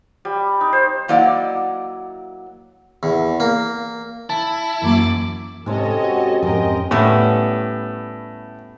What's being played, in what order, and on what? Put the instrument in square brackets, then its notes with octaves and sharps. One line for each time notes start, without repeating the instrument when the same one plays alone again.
[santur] G3
D#4
C5
[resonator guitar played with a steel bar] F#3 A#3 E4 D5 D#5 F#5
[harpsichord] E2
A#3
[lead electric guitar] E4 [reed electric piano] A5
[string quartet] F#2 D6 A6 [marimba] E3 A#3
[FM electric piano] G#2 [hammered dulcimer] C3 G#3 C#4 [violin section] A4 C#5 D#5
[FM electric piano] F#4
[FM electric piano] F2 G#2 [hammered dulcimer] G#3 [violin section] A#4 D#5 G5
[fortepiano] A2 [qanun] G3 B3 C#4